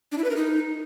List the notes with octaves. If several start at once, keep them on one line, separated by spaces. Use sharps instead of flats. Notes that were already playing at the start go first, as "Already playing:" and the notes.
D4
E4
B4
A#4
D#4